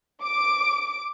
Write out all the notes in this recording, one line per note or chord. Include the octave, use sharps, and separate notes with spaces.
D6 D7